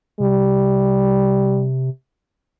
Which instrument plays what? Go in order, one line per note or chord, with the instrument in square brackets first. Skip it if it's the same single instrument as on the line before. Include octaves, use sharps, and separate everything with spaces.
[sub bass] C3 [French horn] G3